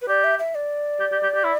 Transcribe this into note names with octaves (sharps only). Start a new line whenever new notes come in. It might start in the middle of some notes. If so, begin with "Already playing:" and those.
B4
G4 D5
E5
E5
D5
G4
G4
G4
G4
E4